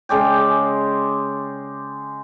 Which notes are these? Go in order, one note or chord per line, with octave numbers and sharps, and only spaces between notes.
C#3 G#3 D5 G5